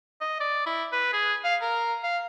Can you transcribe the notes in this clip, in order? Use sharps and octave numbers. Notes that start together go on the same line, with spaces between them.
D#5
D5
E4
B4
G#4
F5
A#4
F5